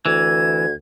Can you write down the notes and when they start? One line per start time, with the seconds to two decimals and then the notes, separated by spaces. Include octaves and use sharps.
0.06 D2 E3 G#6